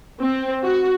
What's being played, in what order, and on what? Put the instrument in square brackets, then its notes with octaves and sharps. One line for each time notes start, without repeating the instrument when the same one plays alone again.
[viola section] C4
F#4